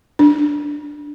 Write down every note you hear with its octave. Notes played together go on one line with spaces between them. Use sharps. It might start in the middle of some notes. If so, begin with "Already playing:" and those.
D4